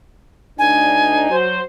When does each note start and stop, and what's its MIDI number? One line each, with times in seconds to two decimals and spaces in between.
0.59 1.27 38
0.59 1.27 62
0.59 1.27 63
0.59 1.36 80
1.30 1.59 54
1.30 1.59 66
1.30 1.59 72